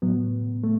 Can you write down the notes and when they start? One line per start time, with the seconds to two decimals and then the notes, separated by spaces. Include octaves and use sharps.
0.02 A2 F#3 B3
0.64 A3